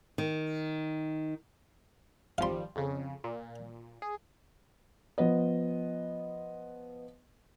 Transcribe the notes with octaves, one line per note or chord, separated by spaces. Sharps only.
D#3
G#1 F3 G3 F5 C6
F2 C#3
A#2
G#4
F3 B3 D#5